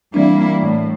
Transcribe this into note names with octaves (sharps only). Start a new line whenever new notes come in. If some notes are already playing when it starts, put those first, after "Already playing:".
E3 G3 A#3 C4 D4 E4
A2